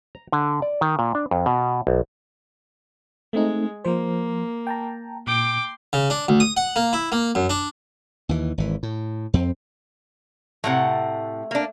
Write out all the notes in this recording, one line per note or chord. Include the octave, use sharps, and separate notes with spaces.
A#5
D3
D5
D#3
A#2
D4
F2
B2
B1
G#3 A3 C4 D#4
F3 A#3 C5
G5 A5 A#5
A#2 G5 C6 D6
C#3
D4
D2
D#6
F#5
A#3
E4
A#3
F#2
D4
D#2 E3
G#1 E3
A2
F2 C4
A2 C3 A3 F#5
A#3 D4